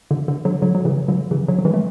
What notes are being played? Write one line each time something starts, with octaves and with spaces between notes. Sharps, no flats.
D3
D3
D3 F#3
D3 F#3
F#3
C#3 E3
D3 F#3
C#3 E3
D3 F#3
F#3
E3 G#3
A3